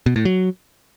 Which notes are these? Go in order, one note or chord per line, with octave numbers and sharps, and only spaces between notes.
B2
A2
F#3